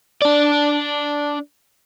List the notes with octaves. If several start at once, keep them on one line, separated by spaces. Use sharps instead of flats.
D4 D5